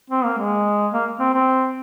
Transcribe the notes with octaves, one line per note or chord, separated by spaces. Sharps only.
C4
A#3
G#3
A#3
C4
C4